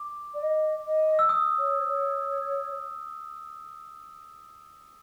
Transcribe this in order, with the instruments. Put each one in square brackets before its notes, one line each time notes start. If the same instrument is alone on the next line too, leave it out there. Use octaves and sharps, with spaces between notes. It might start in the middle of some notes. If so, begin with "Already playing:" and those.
Already playing: [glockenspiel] D6
[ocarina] D5
D#5
D#5
[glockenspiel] E6
D#6
[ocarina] C#5
C#5